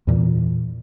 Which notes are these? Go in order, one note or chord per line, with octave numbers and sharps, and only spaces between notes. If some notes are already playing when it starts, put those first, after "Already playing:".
E2 A#2 E3